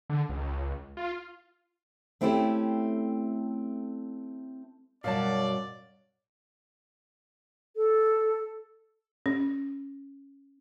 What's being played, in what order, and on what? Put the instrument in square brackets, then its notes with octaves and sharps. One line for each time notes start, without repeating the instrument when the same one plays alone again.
[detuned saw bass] D3
C#2
F4
[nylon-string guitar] A3 C4 C#4 E4 G4 A4
[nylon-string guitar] F#2 B2 F#3 [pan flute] G3 [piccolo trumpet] D5 [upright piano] F5 A5
[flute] A4
[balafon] C#4